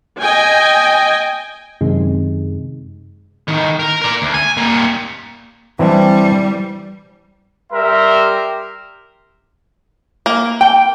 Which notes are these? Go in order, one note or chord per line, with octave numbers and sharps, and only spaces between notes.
D#5 G5 G#5
F#2 C3 D#3 G#3
A2 D#3
A#4
A#4 D5
D2
G#5
G3 A#3
E3 G3 C4 D4
G3 G4 A#4 E5 C6
A#3
G5